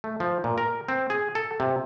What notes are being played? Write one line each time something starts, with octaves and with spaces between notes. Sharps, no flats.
A3
F3
A#2
A#4
C4
G#4
A4
C3